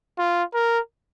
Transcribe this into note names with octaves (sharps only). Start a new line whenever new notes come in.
F4
A#4